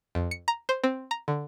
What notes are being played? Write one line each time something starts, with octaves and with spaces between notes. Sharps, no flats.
F2
C#7
A#5
C5
C4
A#5
D3